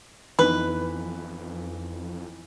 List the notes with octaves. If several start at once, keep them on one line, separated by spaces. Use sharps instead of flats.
F2 E3 B3 D#4 B4